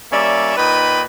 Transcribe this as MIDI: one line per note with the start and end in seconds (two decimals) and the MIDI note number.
0.12 0.57 55
0.12 0.57 58
0.12 0.57 61
0.12 0.57 74
0.12 0.57 76
0.57 1.02 46
0.57 1.02 63
0.57 1.02 71
0.57 1.02 75
0.57 1.02 79
0.57 1.02 83